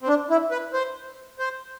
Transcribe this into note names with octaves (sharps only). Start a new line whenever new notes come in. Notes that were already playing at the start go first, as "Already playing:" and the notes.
C4
D4
E4
B4
C5
C5